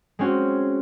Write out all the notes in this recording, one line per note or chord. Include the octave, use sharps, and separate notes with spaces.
G#3 C4 C#4 F#4